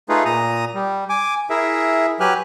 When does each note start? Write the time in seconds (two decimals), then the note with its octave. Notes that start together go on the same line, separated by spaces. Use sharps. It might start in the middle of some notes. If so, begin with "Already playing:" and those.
0.09 A3 D#4 F4 G#4 B4
0.25 A#2 A#5 D#6
0.74 G3
1.10 G#5 D6
1.50 E4 G#4 A#4 E5
2.20 F#3 G4 B4 G#5 F6 F#6